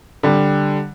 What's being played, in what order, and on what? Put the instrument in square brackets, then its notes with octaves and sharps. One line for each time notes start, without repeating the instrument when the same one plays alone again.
[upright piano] D3 G3